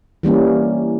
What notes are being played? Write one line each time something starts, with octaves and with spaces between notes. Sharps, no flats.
E3 G3 A#3 C#4